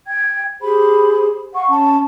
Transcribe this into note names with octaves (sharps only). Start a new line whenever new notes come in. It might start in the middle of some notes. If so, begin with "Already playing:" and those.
G5 G#6
G4 G#4 C5 B5
F5 F#5 C#6
C#4 A5